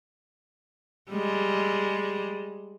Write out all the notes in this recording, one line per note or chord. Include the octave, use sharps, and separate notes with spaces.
G3 G#3